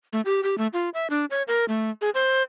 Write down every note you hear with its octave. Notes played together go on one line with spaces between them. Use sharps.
A3
G4
G4
A3
F4
E5
D4
C#5
A#4
A3
G#4
C5